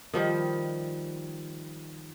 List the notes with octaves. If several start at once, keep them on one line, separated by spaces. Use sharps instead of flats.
D#3 F3 G3